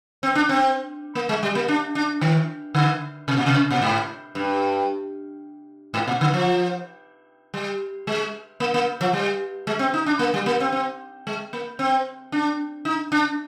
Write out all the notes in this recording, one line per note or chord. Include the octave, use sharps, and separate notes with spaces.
C4
D4
C4
A#3
G#3
G3
A#3
D4
D4
D#3
D3
C3
A#2
C3
A#2
G#2
G2
G#2
A#2
D3
F3
G3
G#3
A#3
A#3
F3
G3
G#3
C4
D#4
D4
A#3
G3
A#3
C4
C4
G#3
A#3
C4
D4
D#4
D4